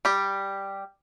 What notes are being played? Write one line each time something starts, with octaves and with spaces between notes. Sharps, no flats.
G3 G4